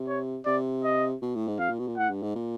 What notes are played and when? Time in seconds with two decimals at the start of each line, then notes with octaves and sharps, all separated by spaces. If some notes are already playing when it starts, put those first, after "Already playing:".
Already playing: C3
0.08 C#5
0.46 C3 D5
0.84 D#5
1.22 B2
1.35 A2
1.48 G#2
1.59 F2 F5
1.69 A#2
1.79 B2
1.88 A#2
1.97 A2 F#5
2.10 G2
2.22 G#2
2.35 A#2